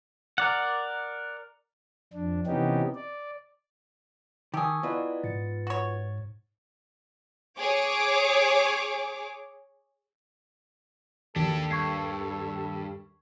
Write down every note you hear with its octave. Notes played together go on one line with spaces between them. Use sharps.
A#4 D5 F#5
F2 D4
C3 E3 B3 C#4 D#4 G4
D5
D#3 G4 G#4 A5 C#6 E6
B3 E4 F4 B4 D5 D#5
G#2 A6 C#7
F#4 C#5
G#4 C#5 D6
D#2 D4 G4 A4
G2 C#6 G#6 C7